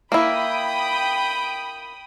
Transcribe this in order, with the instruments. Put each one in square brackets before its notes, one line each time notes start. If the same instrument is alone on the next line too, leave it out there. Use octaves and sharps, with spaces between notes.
[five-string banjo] A#3 E4 [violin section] G5 B5 D#6